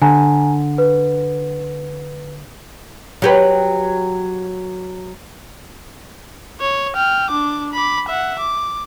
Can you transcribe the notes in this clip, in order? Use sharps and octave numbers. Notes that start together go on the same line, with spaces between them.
D3 G#5 A#5
B4
F#3 G4 B4
C#5
G5 F6
D4 D6
B5 D6
E5 F#5
D6